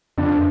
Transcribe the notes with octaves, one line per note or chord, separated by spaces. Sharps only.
F2 D3 D4